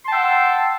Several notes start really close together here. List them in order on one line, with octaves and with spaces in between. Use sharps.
C6 A5 G5 E6 F#5